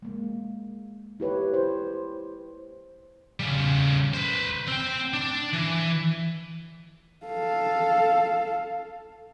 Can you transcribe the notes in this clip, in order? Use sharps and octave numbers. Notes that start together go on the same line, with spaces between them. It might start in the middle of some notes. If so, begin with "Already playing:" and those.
G#3 A#3
E4 G4 B4 C#5
C5
C#3 G3
B4 C5
C4 G5
D4
E3
A4 F5